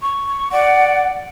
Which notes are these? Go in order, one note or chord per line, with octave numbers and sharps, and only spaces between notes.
C#6
D5 F#5